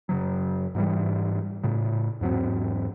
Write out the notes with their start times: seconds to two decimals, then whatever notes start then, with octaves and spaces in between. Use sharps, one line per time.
0.09 F#2 C#3 F#3
0.75 G#2 E3 G3
1.63 A2 C#3
2.21 E2 G#2 F#3 C4